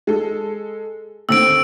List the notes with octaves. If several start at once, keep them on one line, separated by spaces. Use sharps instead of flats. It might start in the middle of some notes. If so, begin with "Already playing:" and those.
G#3 A4
D#2 D3 C4 E6 D7